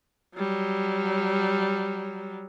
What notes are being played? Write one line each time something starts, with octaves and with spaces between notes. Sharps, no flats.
F#3 G3